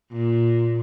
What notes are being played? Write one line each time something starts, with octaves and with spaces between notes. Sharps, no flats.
A#2